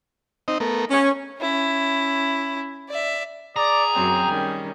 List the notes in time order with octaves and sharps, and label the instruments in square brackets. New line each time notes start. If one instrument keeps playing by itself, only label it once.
[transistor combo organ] C4 D#4 D#5
A3 B3 A#4
[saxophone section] C#4 [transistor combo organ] C#5
[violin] C#4 E4
D5 E5
[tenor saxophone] G#4 [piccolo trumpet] D5 [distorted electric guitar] A#5
[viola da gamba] F#2 F#3 C4 [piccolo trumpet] G5
[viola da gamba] D#3 G3 C#4